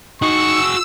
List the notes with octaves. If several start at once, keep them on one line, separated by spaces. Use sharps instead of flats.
D#4 F#4 G#4 C#6 E6